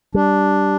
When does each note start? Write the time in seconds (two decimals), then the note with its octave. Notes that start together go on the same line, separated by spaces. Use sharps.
0.14 G3 D4